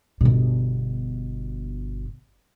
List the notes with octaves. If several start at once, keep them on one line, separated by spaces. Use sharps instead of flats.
G1 B2